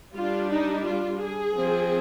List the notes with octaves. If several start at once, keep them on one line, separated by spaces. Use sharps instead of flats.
G3 D4 F4
D#4
F4
G#4
F3 C4